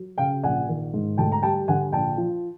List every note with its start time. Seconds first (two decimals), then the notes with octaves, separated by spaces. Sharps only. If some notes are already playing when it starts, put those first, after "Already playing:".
Already playing: F#3
0.18 C#3 F5 G5
0.43 A#1 F#5 G#5
0.68 D#3
0.94 G#2
1.18 D2 G5 A5
1.32 A#5
1.42 G3 G5 A5
1.68 D3 F#5 G#5
1.92 A#1 G5 A5
2.18 F3